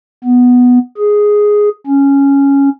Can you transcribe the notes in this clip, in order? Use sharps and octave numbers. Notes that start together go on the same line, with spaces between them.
B3
G#4
C#4